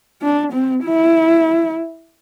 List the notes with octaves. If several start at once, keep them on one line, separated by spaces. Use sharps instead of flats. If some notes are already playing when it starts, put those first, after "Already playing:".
D4
C4
E4